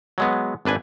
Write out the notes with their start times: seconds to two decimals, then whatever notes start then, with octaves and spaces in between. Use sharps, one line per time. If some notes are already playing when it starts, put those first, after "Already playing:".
0.18 F#3 G#3 B3
0.65 G#1 D4 B4 G#5